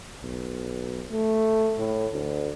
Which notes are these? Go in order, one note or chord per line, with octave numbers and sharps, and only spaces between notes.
B1
A3
A2
D2